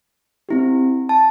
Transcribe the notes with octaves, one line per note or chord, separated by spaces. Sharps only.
C4 E4 G4
A5